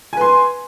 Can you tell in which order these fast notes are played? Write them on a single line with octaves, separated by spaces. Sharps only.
G#5 B4 C6